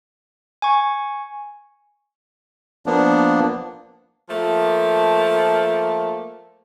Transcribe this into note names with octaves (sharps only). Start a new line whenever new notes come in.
G#5 C#6
F3 A#3 B3 D4
F3 A3 A#3